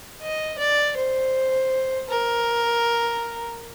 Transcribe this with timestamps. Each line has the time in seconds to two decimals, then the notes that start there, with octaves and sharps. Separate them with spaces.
0.22 D#5
0.59 D5
0.97 C5
2.10 A#4